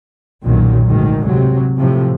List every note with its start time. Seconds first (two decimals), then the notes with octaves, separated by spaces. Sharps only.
0.44 B1 F#2 A#2 D#3 F#3
0.85 D2 G#2 D#3
1.24 C3 F#3
1.77 A2 C3 F3